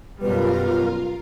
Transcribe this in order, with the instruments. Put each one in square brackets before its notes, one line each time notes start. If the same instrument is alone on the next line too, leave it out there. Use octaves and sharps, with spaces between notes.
[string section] F#2 B2 G3 [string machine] F4 A#4 F5 [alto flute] B4